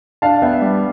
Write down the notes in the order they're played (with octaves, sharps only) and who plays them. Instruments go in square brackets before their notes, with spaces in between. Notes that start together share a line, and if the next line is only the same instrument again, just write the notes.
[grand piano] D4 F5 A5
B3 E5 G5
G3